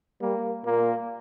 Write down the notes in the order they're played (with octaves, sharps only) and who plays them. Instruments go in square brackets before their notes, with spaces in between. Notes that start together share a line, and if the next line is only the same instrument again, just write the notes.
[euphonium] G3 [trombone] A#3
[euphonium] A#2 [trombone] A#3